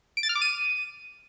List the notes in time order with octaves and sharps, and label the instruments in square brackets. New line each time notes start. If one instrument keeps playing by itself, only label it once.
[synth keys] D7
A6
F6
D6
D#7